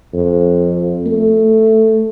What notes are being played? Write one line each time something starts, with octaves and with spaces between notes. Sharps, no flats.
F2
A3